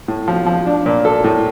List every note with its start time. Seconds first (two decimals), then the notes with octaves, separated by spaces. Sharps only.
0.08 A2
0.28 F3
0.46 F3
0.67 D4
0.86 A#2
1.05 A4
1.24 A2